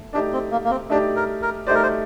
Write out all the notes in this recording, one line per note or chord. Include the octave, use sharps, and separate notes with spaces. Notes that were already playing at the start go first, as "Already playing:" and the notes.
Already playing: A3
A3 D4 D#4 G4 D5
C4
A#3
A#3
C4
A3 D4 D#4 G4 D5
A#4
A#4
A3 D#4 G4 C5 D5
A#4
C5